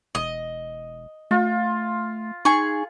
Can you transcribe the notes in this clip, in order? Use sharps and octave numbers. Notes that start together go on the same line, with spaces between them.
E1 D#5
A3 F4
D#4 G#4 C#6